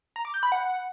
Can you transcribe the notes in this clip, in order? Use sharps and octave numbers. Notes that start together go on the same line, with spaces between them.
A#5
D6
G6
B5
F#5